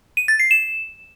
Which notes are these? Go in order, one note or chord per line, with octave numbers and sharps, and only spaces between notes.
D#7
A6
C7
E7